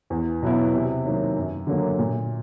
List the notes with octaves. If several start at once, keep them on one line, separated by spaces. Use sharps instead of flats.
E2
B2 F#3 B3 E4
C3
D#3 F#3 A#3
F#2
D3 F#3 A#3
A#2